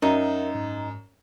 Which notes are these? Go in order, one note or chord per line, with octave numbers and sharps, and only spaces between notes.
F#2 D#4 A#4 E5 F#5
G#2